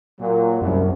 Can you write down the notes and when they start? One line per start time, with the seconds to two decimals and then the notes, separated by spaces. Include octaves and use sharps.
0.20 A#2 F#3
0.61 C2 F#2